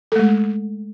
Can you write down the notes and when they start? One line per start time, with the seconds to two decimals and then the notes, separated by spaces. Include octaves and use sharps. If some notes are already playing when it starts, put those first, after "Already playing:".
0.12 A4
0.16 A3
0.19 G#3